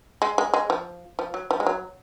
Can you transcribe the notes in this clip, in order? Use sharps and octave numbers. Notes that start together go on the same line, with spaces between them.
G#3
G#3
G#3
F3
F3
F#3
F3
G#3
F#3